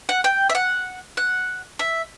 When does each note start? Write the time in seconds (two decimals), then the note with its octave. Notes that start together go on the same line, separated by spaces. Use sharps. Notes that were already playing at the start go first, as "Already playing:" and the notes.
0.09 F#5
0.24 G5
0.50 E5
0.55 F#5
1.17 F#5
1.79 E5